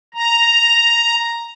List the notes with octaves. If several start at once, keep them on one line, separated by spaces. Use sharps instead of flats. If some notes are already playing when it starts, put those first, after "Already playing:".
A#5